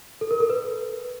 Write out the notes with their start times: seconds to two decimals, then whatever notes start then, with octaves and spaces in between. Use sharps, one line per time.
0.21 A4
0.31 A#4
0.40 A4
0.50 B4